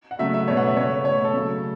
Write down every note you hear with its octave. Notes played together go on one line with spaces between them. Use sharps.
F#5
C#3 F#3 A3 E5
E5
B2 A3 C#5
F#5
E5
C#3 A3 C#5
B2 A3 C#5
A4
C#3 F#3 A3